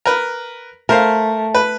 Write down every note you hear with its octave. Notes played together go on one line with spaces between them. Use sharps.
A#4 B4
A3 A#4 C5 F5
B4